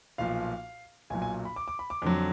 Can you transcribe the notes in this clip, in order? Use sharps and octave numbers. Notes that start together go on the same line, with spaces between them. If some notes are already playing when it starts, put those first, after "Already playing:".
B1 A#2 F3 F5
B1 A#2 F#3 G#5
G#5
B5
D6
D6
B5
D6
F2 D3 F#3